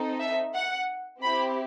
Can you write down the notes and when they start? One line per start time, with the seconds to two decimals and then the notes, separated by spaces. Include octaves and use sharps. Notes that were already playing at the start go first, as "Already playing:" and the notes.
Already playing: C4 D#4 A4
0.19 E5
0.55 F#5
1.23 C4 E4 G4 B5